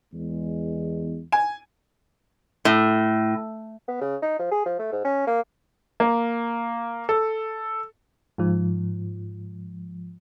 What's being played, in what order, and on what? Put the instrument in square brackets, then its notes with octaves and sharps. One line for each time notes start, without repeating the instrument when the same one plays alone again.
[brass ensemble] E2 G#3
[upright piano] G#5
[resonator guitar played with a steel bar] A2
[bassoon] B3
C#3
D#4
F3
G#4
F3
A3
G#2
C#4
A#3
[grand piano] A#3
A4
[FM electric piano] G#2 F3